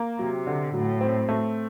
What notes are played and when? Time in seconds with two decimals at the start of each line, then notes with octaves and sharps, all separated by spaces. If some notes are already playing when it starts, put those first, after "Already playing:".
Already playing: A#3
0.19 C3 F#3
0.47 D3
0.73 A2 F#3
1.01 C4
1.29 A3